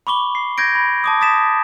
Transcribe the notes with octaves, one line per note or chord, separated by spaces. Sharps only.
B5 C#6 D6 G7
C7
G6 G#6 A#6 D7
B5
A5 D6 D#6
D#6 A6 B6 E7